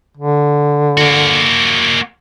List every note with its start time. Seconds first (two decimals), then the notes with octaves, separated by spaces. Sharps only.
0.17 D3
0.97 A#3 F#4